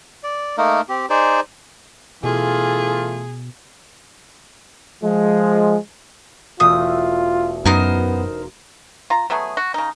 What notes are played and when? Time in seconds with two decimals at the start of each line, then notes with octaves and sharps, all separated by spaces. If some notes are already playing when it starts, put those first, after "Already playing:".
0.23 D5
0.58 A3 A#3 D#4 A#4
0.89 C4 G4
1.10 D#4 G#4 C5 D5
2.24 B2 E3 A3 F4 G#4
5.02 F3 G#3
6.60 E1 A3 F4 E5 D#6
7.66 F#2 B3 D#4 A#4 C5
9.10 F4 A#5
9.30 F#3 A3 B3 G#4
9.57 F#4
9.74 C#3 D#4